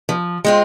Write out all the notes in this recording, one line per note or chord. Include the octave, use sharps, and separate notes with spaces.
F3
G#3 C4 F4